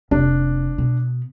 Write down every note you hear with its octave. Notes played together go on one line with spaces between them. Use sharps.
F1 D4
B2